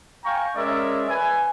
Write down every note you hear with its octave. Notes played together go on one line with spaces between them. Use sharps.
F5 G5 G#5 A#5 C#6
G#3 C#4 A#4 D5 E5
B4 G#5